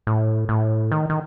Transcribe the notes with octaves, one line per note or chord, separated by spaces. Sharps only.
A2
A2
D#3
D#3